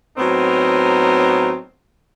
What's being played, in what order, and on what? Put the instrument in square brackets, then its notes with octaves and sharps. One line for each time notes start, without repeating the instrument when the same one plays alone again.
[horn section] A2 F#3 B3 C4 D#4 A#4